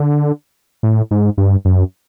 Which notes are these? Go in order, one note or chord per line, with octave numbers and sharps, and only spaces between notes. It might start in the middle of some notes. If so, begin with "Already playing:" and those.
Already playing: D3
A2
G#2
G2
F#2